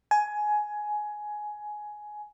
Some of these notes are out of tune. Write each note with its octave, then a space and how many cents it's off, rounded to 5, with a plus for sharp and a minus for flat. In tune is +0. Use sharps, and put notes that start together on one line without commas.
G#5 +15